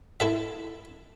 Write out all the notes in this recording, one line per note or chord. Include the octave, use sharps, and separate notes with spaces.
E4 A4 E5